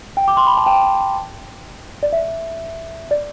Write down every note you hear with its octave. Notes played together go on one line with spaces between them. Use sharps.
G5
D6
C6
B5
A5
G5
D5
E5
D5